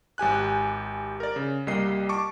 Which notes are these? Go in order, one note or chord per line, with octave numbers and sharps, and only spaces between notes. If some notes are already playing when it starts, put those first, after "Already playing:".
G#1 G4 G#5 F#6
A#4 D5
C#3
C2 G3 A#3 D#5 C7
A5 C#6 D6